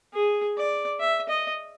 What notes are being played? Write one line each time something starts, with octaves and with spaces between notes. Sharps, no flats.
G#4
D5
E5
D#5